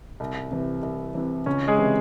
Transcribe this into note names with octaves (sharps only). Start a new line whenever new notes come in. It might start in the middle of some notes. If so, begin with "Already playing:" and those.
C2
C3 E3
C2
C3 E3
C#2 C#4
G#3 G#4
C3 E3